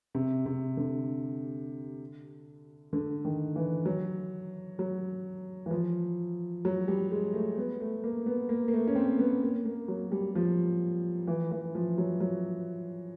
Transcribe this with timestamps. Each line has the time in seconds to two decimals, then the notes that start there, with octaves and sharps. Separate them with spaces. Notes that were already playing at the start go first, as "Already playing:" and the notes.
0.15 C3
0.46 C3
0.77 D3
2.93 D3
3.25 D#3
3.56 E3
3.85 F#3
4.79 F#3
5.66 E3
5.71 F3
6.65 F#3
6.88 G3
7.11 G#3
7.34 A3
7.58 B3
7.80 A3
8.04 A#3
8.26 B3
8.49 A#3
8.68 A#3
8.73 A3
8.87 C#4
8.95 C4
9.19 B3
9.43 A#3
9.65 A#3
9.88 F#3
10.12 G3
10.35 F3
11.28 E3
11.51 E3
11.75 F3
11.98 F#3
12.20 F#3